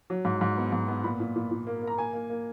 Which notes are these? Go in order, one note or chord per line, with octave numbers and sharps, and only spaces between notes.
F#3
G#2
G#2
B3
G#2
B3
A#2 B5
A#2
A#2
A#2
A#3
A#3
A#5
A#3 G#5
A#3
A#3